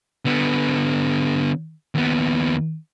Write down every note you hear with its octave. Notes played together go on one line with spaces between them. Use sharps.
D3 B3
D#2 B3